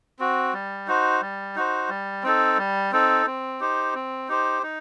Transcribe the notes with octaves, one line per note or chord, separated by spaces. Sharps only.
C4 F#4
G3
D#4 F#4 C5
G3
D#4 F#4 C5
G3
C4 D#4 A4
G3
C4 D#4 A4
C4
D#4 G4 C5
C4
D#4 G4 C5
D#4